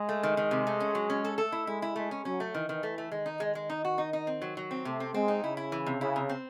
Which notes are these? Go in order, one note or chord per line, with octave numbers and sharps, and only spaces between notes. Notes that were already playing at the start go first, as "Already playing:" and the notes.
Already playing: G#3
A3
D#3
D#3
C3
A3
C#4
F#3
C#4
A4
A3 A4
E4
G#3 E4
E4
G#3 A3
C#4
F#3 C#4
A3
D#3 E3
D#3
A3
A3
D#3 G#3
D#4
G#3
G#3
D#4
F#4
D#4
D#4
C4
F#3
F#3
C4
C3 A3
C4
G#3 C4
D#4
C#3 E4
E4
E3
C3
C#3 E4
C3
C4